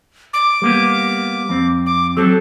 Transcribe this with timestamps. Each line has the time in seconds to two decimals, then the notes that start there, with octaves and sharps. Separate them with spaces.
0.33 D6
0.62 G3 A#3 B3
1.49 F2 C4
1.86 D6
2.17 F#3 C4 A4